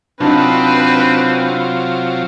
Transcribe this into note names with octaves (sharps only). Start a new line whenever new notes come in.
C3 F#3 C4 D4 D#4 F4 B4